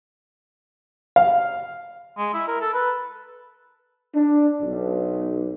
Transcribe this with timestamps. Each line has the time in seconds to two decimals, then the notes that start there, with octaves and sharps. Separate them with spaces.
1.16 F5
2.17 G#3
2.34 E4
2.48 A#4
2.61 A4
2.74 B4
4.14 D4
4.62 B1